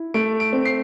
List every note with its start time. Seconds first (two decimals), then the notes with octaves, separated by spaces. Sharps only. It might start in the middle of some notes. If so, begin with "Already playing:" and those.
Already playing: E4
0.14 A3 D7
0.40 D7
0.53 C4
0.65 C7